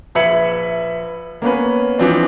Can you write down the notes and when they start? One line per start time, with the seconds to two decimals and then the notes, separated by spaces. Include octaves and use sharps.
0.15 A#1 B4 E5 G#6 C#7 F#7
1.42 A#3 B3 C#4 B4
1.98 E3 F3 C4 D4